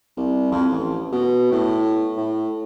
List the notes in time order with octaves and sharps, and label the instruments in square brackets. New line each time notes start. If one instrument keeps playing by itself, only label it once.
[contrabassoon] C2
F2
A1
B2
A2
A2